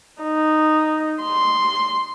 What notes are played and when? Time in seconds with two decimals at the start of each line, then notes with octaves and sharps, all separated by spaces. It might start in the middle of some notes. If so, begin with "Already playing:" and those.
0.22 D#4
1.22 C6